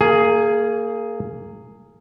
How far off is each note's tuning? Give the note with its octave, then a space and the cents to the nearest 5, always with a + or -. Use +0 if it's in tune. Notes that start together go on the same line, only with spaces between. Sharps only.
A#3 -20 G#4 +10